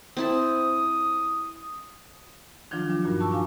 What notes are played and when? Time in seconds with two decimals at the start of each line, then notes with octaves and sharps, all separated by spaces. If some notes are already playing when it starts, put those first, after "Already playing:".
0.17 C4 E4 A5 D#6
2.71 D#3 F3 F#3 D4 F4
2.89 G3 D4
3.04 G2 A#2 G3 D#4 F#4
3.20 A5 C#6 E6
3.32 D4 F4 F5 G#5 A#5